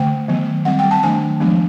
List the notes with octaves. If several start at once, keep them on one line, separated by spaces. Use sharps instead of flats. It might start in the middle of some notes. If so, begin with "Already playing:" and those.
Already playing: D3 A3 G5
D#3 F#3 B3
G3 C4 F#5
G5
A5
D#3 F#3 A3 D4 G#5
F3 G#3 B3 D4